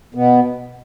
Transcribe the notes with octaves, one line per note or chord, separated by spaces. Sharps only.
B2 B3